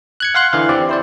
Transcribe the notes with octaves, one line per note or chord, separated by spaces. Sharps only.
F#6 G#6 C#7
F5 F#5 C6 F#6
D3 E3 F5
C4 G4 D5
E4 C5 D5